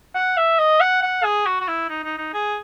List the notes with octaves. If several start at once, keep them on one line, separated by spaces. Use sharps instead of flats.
F#5
E5
D#5
F#5
F#5
G#4
F#4
F#4
E4
D#4
D#4
D#4
G#4